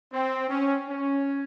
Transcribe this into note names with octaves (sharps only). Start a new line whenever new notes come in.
C4
C#4
C#4